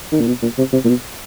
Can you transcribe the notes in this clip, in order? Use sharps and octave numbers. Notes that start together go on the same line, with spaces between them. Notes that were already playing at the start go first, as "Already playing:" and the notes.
D#3
A#2
B2
A#2
C3
C3
A#2
B2